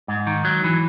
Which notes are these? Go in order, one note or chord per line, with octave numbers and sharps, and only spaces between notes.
G#2
D#3
F#3
E3